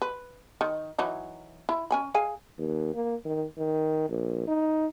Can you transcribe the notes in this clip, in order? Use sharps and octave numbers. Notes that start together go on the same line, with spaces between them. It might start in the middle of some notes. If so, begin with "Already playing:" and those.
B4
D#3
E3 F#3 D#4
E4
C#4 G#5 B5
G#4 F5 G#5
D#2
A#3
D#3
D#3
A#1
D#4